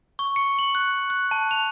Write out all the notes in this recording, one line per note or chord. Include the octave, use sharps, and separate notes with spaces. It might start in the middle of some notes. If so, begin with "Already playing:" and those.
C#6
C#7
F#7
F#6
F#6
A5
F7